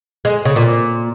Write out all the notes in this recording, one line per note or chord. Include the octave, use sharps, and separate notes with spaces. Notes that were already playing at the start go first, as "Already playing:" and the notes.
G#3
C#3
A#2